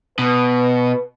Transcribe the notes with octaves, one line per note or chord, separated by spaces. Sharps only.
B2 B4